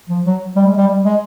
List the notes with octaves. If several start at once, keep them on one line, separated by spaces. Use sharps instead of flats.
F3
F#3
G3
G#3
G3
G3
G#3